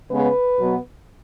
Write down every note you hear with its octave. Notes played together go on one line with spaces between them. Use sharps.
C#3 G#3 B3 B4
B2 F#3 B3